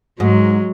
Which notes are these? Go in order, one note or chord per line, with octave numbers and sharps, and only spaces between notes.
G#2 F#3 G#3